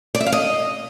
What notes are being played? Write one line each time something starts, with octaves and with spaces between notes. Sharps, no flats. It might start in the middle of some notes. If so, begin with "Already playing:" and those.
D5
E5
F5
D#5